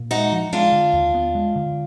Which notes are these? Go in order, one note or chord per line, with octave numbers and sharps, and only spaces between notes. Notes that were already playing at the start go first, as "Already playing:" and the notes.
Already playing: A#2
G#3 D#4 F#4
F3
G#3 D4 F4
D3
D#2
B3
G#3
D3